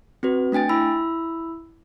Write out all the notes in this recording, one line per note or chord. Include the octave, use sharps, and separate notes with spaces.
C4 F#4 B4
A3 D4 G5 G#5 A6
E4 B5 E6